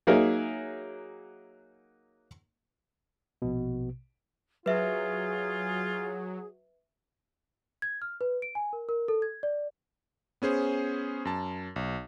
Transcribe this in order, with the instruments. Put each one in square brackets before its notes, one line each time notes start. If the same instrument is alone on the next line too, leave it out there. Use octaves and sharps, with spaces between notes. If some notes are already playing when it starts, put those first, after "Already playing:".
[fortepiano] F#3 A#3 D#4 G#4 A#4 E5
[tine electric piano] A#1 B2
[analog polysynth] F#3 [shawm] F4 [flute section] G#4 [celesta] B4 E5
[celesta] G#6
F6
B4
D7
G#5
A#4
A#4
A4
G#6
D5
[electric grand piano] B3 C#4 G#4 C5
F#2 A5
B1